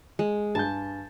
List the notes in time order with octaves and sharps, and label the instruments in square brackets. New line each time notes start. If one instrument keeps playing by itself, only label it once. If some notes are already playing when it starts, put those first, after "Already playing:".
[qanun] G#3
[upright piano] G2 G#5 G6 [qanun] A5